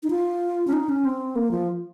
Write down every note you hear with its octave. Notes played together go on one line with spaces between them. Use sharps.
D#4
F4
C#4
D#4
C#4
C4
A#3
F3